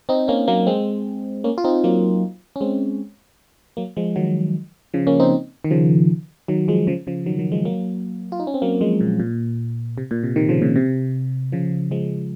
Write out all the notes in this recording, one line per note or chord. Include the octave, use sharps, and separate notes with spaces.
C4 D#4
A#3 C#4
F#3 A#3
G#3 C4
A#3 C#4
F4
C4 D#4
F#3 A#3
C#4
G#3 C4
F#3 A#3
F3 G#3
D#3 F#3
C#3 F3
A#3 C#4
C4 D#4
D#3
C#3 F3
D#3 F#3
F3 G#3
C#3 F3
C#3 F3
D#3 F#3
D#3 F#3
F3 G#3
F#3 A#3
F4
D#4
C#4
C4
F#3 A#3
F3 G#3
A#2
A#2
C3
A#2
C3
C3 D#3
C#3 F3
A#2 C#3
C3
C#3 F3
F3 G#3